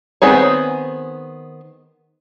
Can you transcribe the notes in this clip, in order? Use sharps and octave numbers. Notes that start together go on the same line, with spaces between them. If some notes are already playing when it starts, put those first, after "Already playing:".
D#3 B3 C4 G#4 C#5